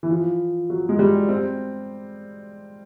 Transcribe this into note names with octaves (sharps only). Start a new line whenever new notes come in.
E3
F3
F#3
G#3
G3
C4